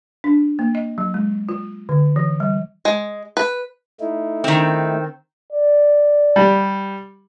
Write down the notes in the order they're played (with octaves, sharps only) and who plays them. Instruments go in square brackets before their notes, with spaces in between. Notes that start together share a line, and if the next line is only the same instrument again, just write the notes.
[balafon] D4
A#3
D#5
F#3
G#3
F4
D3
E3
G3
[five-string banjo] G#3
B4
[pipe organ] A3 D#4 E4
[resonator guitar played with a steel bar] D#3 C4
[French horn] D5
[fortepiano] G3